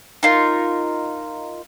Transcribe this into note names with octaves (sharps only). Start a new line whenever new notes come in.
D#4 F4 A#4